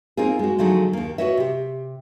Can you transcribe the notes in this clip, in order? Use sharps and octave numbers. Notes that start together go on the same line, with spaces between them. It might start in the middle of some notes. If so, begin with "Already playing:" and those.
A#3 C4 D#4 F4 G#4
G#3 F#4
D3 F3 F#3 A3 D#4 G#4
D#2 A#3
F#4 A4 B4 C#5 D#5 E5
C3 G4